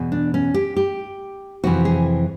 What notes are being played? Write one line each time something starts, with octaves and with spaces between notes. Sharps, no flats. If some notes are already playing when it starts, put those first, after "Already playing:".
Already playing: E2 B2
D4
C#4
G4
G4
F2 C3 E3 F#4
G#4